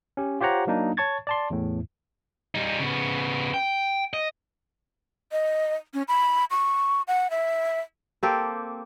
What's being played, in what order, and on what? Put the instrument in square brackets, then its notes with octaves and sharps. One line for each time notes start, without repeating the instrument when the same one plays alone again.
[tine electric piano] C#4 G4
F4 G4 C5 C#5 F#5 A#5
F#3 A#3 D4 D#4
C#5 A5 C#6 G#6 A6
D5 A5 C6
E2 A2
[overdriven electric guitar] G3 D#4
C#3 B3
G5
D#5
[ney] D#5
C#4
B5
C#6
F#5
E5
[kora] A#3 C4 G4 A4